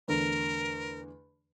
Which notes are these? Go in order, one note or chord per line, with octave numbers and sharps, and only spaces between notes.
E2 D3 A3 A#4